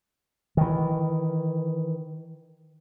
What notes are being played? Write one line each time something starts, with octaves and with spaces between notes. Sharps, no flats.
D#3 E3